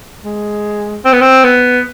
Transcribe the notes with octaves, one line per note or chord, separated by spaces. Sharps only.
G#3
C4
B3
C4
B3